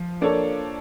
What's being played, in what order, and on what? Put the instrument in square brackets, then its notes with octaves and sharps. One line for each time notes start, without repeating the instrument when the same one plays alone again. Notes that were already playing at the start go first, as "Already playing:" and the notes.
Already playing: [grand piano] F3
A#3 D4 A4 C#5